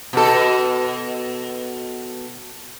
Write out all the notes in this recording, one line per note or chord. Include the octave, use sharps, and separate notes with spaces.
B2 A4